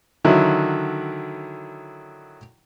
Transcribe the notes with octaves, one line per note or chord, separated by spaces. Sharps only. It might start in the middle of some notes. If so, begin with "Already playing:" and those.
D3 D#3 F#3 E4